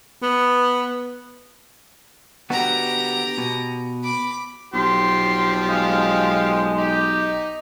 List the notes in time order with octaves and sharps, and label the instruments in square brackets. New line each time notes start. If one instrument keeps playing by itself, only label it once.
[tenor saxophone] B3
[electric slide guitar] D3 B3 F#4 [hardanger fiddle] G4 A#5
[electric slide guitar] B2
[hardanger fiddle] B5 D6
[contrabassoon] B1 [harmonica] F3 G4 [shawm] C6
[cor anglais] G#3 [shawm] F5
[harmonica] D#4 [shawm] G4